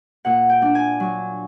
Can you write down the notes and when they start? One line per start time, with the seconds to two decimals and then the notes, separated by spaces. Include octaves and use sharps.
0.25 A#2 F#5
0.49 G5
0.62 D4
0.75 G#5
1.00 F#3